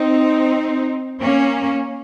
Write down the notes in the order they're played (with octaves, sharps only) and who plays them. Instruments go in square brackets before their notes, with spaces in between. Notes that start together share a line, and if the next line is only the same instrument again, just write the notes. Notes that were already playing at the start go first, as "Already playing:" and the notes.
Already playing: [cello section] C4 D#4
A#3 C#4